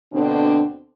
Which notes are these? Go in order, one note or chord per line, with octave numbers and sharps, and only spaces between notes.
D2 B2 D3 C4 D4